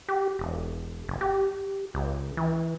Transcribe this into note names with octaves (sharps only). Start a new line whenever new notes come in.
G4
E1
F#1
G4
C#2
E3